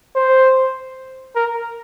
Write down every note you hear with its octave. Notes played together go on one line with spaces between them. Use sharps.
C5
A#4